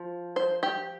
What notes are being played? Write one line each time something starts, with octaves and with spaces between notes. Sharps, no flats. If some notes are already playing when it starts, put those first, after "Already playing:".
Already playing: F3
C5
G4